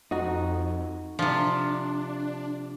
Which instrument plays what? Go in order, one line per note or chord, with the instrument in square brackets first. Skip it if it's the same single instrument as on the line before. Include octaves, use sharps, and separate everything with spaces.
[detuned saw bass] F2 [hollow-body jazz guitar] D#4 F#4
[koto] C3 F3 [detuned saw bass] D4